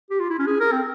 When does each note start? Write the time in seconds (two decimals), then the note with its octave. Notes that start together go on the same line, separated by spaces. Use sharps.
0.10 G4
0.20 F4
0.29 E4
0.39 C#4
0.47 G#4
0.60 A#4
0.72 C4